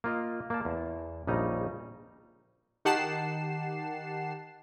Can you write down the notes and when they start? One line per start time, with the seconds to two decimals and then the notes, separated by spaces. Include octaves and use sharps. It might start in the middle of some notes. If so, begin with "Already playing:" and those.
0.04 A#3 F4 D#5
0.50 A#3 D5 A5
0.65 E2
1.27 A#1 C#3 G3 D#4 D#5 A#5
2.85 D#3 G4 F#5 A5 C7 E7